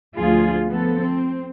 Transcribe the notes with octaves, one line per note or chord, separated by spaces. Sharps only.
D2 F3 F4 G#4
F3 B3 A4
C4